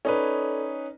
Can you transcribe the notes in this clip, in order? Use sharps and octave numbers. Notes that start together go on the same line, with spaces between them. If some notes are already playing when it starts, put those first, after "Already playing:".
C#4 D#4 A4 B4 D5